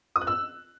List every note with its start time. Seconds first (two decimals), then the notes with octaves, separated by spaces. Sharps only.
0.16 D#6
0.21 F#6
0.27 E6